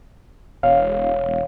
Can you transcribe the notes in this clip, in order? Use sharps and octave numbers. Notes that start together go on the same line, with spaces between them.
E1 C#5 F5